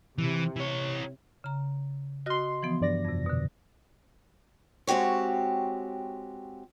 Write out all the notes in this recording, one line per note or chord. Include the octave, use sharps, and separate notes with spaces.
C3 E3
E3 C#5
C#3 A#5
F#4 D#5 C6 F6
E3 F3 B3
G2 D5 A#6
F2 C3
B2 D3
G#3 C4 F#4 G4 C#5